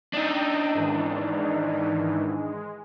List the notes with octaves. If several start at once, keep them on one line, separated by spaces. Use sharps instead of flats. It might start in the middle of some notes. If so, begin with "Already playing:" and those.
D4 D#4 D#5 G5 E6
G#2 D#3 E3
G#3